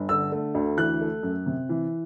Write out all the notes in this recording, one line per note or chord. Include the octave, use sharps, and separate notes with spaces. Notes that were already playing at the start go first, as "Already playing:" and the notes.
Already playing: G1
D3 E6
A3
D2
E3 F#6
A3
F#2
C3
E3